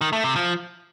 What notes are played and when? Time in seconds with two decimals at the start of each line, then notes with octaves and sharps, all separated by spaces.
0.01 D#3
0.13 A3
0.24 C3
0.36 F3